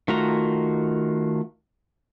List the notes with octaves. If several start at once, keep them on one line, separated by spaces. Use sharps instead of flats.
D#3 A3 F4 F#4 A#5